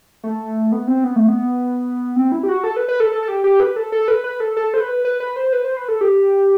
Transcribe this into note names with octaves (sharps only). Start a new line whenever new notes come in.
A3
B3
C4
B3
A3
B3
C4
E4
G4
F#4
A4
B4
B4
A4
A4
A4
G4
G4
B4
A4
A4
B4
B4
A4
A4
C5
B4
B4
B4
C5
B4
C5
B4
A4
G4